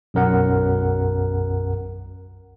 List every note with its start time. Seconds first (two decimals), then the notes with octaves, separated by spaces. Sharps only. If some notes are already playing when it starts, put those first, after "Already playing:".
0.14 B1 F#2 A#4 F#5